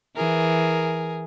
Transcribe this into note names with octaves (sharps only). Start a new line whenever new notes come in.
E3 G#4 A#4